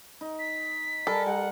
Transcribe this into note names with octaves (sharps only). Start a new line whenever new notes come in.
D#4
B6
G3 A4 A#4 G#5
G3 F#5